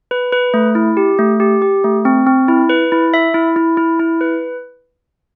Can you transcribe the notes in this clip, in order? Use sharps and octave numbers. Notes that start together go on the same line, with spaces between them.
B4
B4
A3
E4
G4
A3
G4
G4
A3
C4
C4
E4
B4
E4
E5
E4
E4
E4
E4
B4